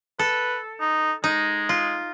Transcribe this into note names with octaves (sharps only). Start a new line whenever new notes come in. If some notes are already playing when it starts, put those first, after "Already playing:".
A4 B4
D#4
G#3 D#4
F4